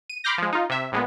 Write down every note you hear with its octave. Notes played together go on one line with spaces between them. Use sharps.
D#7
B5 C6 D6 F6 G6 A#6
F3 G#3
D#4 F4
C3 E5
A#1 G#3 B3